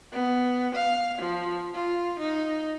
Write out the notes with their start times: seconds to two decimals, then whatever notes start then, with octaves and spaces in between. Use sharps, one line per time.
0.12 B3
0.75 F5
1.18 F3
1.74 F4
2.19 D#4